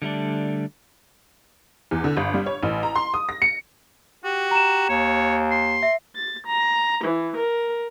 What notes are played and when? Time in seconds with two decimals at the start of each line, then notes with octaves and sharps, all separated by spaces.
0.02 D3 G3 A3 D4
1.91 E2
2.04 D3
2.17 G1
2.34 G3
2.46 C#5
2.63 A1
2.83 A#5
2.96 C6
3.14 D#6
3.29 A#6
3.42 C#7
4.24 F#4 G4
4.51 A#5 E7
4.89 D#2 C#5
5.51 C6
5.83 E5
6.15 A6
6.46 A#5
7.02 E3
7.35 A#4